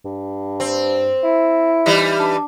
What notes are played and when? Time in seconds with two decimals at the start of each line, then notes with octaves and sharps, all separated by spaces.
0.05 G2
0.60 C4
1.24 E4
1.86 E3 G3 D#4
2.19 D4